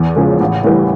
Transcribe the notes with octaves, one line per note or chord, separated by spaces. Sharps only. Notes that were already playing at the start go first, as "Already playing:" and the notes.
Already playing: E2
C#3 F3 G#3
A1
A2 E3 G3